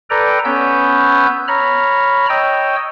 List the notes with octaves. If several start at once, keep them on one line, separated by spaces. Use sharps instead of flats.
A4 B4 D5 G5 A#5
B3 C#4 B4 C#5 E6 G6
C#5 A#5 B5 F6
C#5 D#5 G5 E6